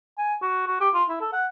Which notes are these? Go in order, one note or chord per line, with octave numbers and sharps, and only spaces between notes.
G#5
F#4
F#4
G4
F4
E4
A4
F#5